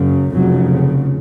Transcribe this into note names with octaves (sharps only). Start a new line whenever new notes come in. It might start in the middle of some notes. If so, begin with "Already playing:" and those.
Already playing: F#1 F#2 C#3
F1 F2 C#3 F#3